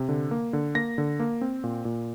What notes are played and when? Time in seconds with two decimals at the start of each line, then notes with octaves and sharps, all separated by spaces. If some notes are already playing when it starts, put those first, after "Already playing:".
Already playing: C3
0.09 D3
0.31 A#3
0.53 D3
0.75 A#3 A#6
0.98 D3
1.20 A#3
1.41 C4
1.64 A#2
1.85 A#2